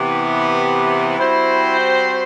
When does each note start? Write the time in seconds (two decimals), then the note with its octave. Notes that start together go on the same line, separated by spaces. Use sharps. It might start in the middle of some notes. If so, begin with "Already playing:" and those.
Already playing: C3 E3 B3 G4
1.19 G3 C4 E4 F#4 C5